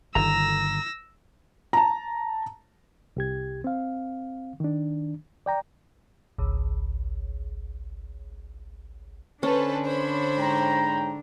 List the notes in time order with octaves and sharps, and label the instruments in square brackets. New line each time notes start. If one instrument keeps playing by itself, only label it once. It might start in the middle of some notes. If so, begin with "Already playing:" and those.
[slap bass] G1 D3 D#3 [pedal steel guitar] A#5 [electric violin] E6 A#6
[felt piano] A5 A#5
[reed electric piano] C2 G4 G#6
C4 F5
D#3 D4
D5 G5 A#5
[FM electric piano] G#1 C#2
[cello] D3 D4 [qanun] C#4 [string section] A4 B4 C5
[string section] C5 C#5 B5
[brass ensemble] G#2 G5 A#5